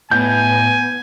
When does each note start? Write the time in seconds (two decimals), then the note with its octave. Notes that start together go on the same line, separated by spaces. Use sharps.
0.11 A2 B3 G#5 G6